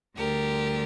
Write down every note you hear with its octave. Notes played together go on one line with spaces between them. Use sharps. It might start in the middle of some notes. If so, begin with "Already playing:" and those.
D2 D3 G3 G4 A#4